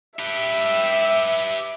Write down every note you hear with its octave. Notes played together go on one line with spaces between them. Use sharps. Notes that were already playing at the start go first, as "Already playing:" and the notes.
G4 B4 E5